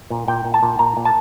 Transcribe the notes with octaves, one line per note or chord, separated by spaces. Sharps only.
A#2
A#2 G5
A#2
A5
A#2
A#2 A#5
A#2
A5